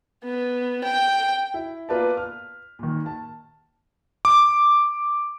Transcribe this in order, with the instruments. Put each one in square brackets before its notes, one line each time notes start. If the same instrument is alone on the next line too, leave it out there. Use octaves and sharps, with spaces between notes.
[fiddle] B3
G5
[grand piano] E4
A#3 B3 F4 B4 D5 A5
F6
A#2 D#3
A5
[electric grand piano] D6